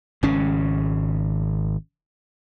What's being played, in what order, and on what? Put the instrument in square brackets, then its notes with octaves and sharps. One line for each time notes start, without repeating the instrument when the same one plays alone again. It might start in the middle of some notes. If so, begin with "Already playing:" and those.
[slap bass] G#1 C#3 C#4